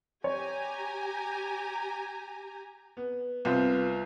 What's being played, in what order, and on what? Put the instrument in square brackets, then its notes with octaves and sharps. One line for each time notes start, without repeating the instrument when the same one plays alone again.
[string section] G4 G#5 A#5 [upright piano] C#5
[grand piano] B3
C2 B3 F4 C5